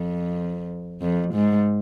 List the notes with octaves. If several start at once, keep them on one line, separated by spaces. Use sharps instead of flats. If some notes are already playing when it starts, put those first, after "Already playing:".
Already playing: F2
F2
G#2